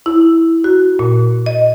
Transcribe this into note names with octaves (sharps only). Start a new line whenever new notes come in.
E4
F#4
A#2
D#5